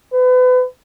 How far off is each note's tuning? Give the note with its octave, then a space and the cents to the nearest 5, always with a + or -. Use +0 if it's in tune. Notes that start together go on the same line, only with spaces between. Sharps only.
B4 +35